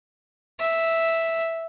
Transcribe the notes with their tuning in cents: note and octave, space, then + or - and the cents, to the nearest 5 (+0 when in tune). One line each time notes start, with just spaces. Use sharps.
E5 -5